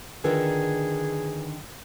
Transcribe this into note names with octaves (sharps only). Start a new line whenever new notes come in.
D3 D#3 D4 F4 G#4 A#4 B4